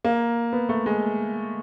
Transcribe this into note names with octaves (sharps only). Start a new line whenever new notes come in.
A#3
B3
A3
G#3